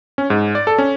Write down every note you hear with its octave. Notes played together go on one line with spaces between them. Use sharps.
C#4
G#2
D5
A4
C#4